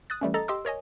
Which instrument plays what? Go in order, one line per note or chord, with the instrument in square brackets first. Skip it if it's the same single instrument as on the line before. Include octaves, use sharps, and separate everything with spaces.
[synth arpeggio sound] D#6 F#6 A6
E3 G3 A3 C#4
A4 D#5 A#5 A6
G4 D#5 C6 D6 E6
A#4 C#5 D#5 G#5